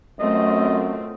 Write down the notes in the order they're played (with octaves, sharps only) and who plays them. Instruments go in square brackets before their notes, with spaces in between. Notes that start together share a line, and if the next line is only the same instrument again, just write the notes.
[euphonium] F#2 [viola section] A3 C4 F4 [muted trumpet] D#5